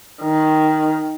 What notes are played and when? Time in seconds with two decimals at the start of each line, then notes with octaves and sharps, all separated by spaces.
0.22 D#3